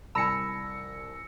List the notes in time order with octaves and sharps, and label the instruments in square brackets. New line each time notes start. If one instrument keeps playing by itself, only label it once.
[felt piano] C2 G#5 [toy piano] A5 B5 [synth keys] E6 A#6 C#7